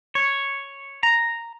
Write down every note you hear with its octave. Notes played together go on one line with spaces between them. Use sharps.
C#5
A#5